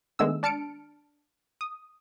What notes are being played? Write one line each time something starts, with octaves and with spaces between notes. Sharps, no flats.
D#3 G#3 A3 B3 D4 E6
D4 A5 F6 C#7 D7
D#6